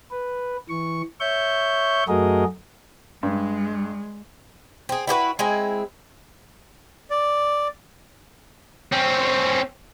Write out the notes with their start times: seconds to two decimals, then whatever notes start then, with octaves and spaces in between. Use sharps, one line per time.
0.11 B4
0.69 E3 C#6
1.20 C#5 E5 C#6 G6
2.08 F#2 A3 F#4 G#4 A#4 D#5
3.23 G2 G#3
4.89 C4 G#4
5.07 E4 F#4 G4 B4
5.39 G#3 C4 E4 G#5
7.10 D5
8.92 C4 C#4